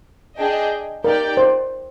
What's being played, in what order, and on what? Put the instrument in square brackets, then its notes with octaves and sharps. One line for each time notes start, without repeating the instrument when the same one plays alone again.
[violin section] D4 G#4 D#5 G5
[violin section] D#4 G4 D5 G5 [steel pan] A#4
[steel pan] C5